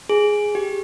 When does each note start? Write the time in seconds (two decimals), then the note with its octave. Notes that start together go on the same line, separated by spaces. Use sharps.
0.09 G#4
0.55 G4